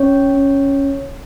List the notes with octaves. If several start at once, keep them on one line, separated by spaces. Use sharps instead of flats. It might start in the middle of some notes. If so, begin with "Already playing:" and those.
Already playing: C#4 C#5
C#4